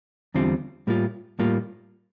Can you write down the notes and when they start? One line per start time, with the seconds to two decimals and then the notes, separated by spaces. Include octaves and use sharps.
0.34 E2 D3 G3 C4 F4
0.87 A2 G3 A#3 F4
1.39 A2 G3 A#3 F4